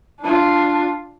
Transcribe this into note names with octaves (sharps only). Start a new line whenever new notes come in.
D4 F4